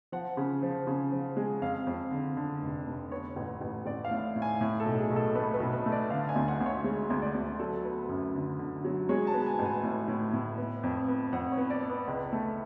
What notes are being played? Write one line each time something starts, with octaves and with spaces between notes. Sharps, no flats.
F3 F#5
C#3
F3
C#3
F3
G#3
F2 F5
F2
D3
D3
F1
F1
B3 C#5
A1
A1
A1 D5
F5
A2
A2
G#5
A2
A4
B1
G#4
B1
A4
A3 B4
B4
B1
B4
A3
D5
D3 F5
G#5
D2
F#5
D2
C#5
G#3
D2
D5
D2
F#3 A4
B3
F#2
D3
D3
F#3
G#3 C#5
A5
B3
G#5
A1
G#5
A2
A2
A2
B3
F2
B3
F2 F#5
C#5
B3
D5
B3
B4
C#2
A3